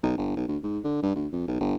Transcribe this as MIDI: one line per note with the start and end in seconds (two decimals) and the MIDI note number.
0.03 0.13 35
0.17 0.36 31
0.37 0.46 35
0.48 0.57 38
0.63 0.79 44
0.84 0.98 50
1.02 1.12 43
1.15 1.27 38
1.32 1.47 41
1.48 1.58 35
1.60 1.75 31